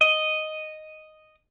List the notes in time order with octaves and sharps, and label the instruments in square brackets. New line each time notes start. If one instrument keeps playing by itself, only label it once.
[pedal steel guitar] D#5